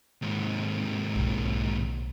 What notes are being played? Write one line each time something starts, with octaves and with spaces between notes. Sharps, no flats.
D#2 G#2
B1 A#2